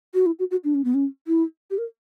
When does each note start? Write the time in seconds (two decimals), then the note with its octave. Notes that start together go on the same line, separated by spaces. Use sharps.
0.14 F#4
0.26 E4
0.39 F#4
0.51 F#4
0.64 D4
0.75 C#4
0.85 B3
0.94 C#4
1.27 E4
1.71 G4
1.78 A#4